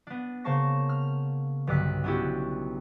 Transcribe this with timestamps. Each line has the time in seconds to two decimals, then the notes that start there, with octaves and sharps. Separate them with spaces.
0.07 B3 D4
0.44 C#3 A#3 C5 A5 C#6 A#6
0.89 F6
1.67 B1 G2 D3 D6 F#6 B6
2.04 B3 C#4 D4 E4 F#4 G4